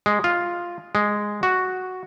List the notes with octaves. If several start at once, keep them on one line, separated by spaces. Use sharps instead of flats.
G#3
F4
G#3
F#4